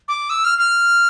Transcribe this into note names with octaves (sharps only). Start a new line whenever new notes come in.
D6
E6
F6
F6